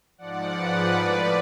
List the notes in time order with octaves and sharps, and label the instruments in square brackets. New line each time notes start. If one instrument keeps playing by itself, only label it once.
[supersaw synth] G#2 F3 D5 F#5
B4 D5
A2 F3